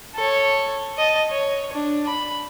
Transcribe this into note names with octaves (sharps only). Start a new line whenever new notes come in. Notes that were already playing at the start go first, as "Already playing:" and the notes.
A4 C#5
D#5 A5
C#5
D4
B5